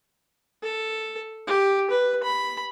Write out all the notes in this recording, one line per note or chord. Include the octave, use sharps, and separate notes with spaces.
A4
G4
B4
B5